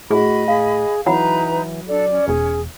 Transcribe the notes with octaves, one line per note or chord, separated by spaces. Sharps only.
A2 F#4 G#4 D#5 B5
G#4 F5
E3 F#3 D#4 E4 B4 F#5 A#5 B5
D4 A4 D5
C#4
E1 G#4